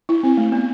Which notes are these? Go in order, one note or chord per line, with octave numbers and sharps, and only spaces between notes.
E4
C4
A3
B3